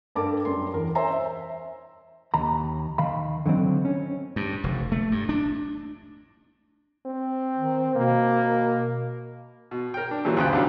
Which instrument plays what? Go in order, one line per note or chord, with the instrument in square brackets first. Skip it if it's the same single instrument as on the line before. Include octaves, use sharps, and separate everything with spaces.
[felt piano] G2 A4 A#4 A5 D6
F#2 G3 C6
E2 A#4
C5 C#5 E5 G#5 A#5 C6
E5
[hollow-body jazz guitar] D#2 A#5 B5
D#3 F5 B5
D3 D#3 F#3 C4
C#4
[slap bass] G2
F1
A3
G2
D4
[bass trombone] C4
[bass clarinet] D#3
[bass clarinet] B2 [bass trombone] A#3
[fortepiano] B2
A#4 G5
D4
A#2 E3 F#3 G3
D2 G2 C#3 F4 G5 F#6
C2 C#3 F#3 D4 F#5